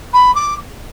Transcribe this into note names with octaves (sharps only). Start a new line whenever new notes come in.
B5
D6